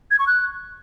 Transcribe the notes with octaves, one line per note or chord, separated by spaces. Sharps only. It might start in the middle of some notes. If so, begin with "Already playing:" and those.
G#6
C#6
F#6